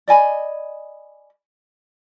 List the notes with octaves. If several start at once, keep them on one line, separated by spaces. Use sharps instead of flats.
D5 D#5 G#5 B5